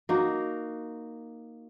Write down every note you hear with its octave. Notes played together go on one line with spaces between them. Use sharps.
A#3 D#4 F#4